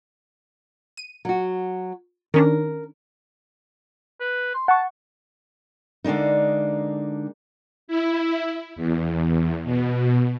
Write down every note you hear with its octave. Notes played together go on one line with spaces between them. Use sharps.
D#7
F#3 F#4
D#3 C#4 D4 A#4
B4
C6
F#5 A5 C#6
D3 G#3 A#3 D4 D#4
E4
E2
B2